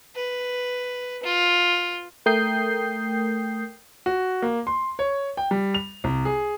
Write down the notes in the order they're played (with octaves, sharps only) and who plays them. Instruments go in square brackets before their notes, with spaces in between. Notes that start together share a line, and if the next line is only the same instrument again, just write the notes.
[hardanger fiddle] B4
F4
[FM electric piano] A3 A#4 G5 D#6 G6 C7
[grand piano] F#4
A#3
C6
C#5
G5
G3
F7
C2
G#4